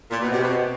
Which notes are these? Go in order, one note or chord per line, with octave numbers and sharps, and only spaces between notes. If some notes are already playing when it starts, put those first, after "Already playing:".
A#2
B2
C3
B2